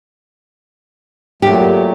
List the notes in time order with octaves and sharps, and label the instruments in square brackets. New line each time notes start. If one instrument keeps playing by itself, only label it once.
[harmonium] A#2 F#3 A3 [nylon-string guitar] G4